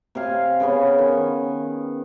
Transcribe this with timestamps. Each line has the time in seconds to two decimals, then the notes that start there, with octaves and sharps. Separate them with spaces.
0.15 C3 C4 F5 G#5
0.60 C#3 B3 C#4
0.98 D#3